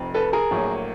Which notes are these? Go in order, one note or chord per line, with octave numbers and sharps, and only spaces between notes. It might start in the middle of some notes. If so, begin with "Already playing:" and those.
Already playing: F1 F2 C3
A4 B4
G#4 A#4
A#1 A2 F#3 A#3